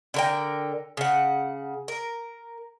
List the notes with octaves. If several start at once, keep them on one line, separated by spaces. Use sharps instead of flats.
D3 A#4 G5
C#3 F#5
A#4